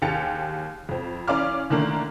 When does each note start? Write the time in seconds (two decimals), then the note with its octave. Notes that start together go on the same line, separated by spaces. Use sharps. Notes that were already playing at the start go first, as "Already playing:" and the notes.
0.02 D#2 G4 G#4 A6 C#7 F7
0.89 F2 C4
1.28 E3 C#4 D5 F5 D6 F6
1.70 D3 D#3 A3 A#3 D4